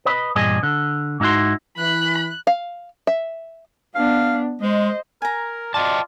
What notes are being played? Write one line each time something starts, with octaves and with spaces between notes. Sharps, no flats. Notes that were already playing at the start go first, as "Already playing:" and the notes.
B4 D#5 B5
E2 G2 A#2 G#4 D#5
D3
G#2 D#4 E4 F#4 C6
E3 B5 F#6
F5
E5
B3 D4 F5
G#3 C5 D#5
A#4 G#5 A#5
F4 D5 D#5 G5 A5